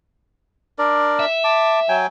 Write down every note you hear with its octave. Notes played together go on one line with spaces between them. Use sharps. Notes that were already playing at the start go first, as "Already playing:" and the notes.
D4 A#4 D5
E5
A5 D6
F#3 G5 G#5